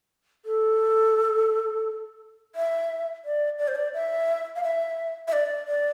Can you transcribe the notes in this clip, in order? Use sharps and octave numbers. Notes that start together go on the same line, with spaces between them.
A4
E5
D5
D5
C5
D5
E5
F5
E5
E5
D5
D5